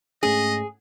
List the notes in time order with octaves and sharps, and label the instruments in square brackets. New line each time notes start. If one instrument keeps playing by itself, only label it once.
[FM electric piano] G#2 A3 C#4 [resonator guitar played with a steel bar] G#4 [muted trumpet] D#5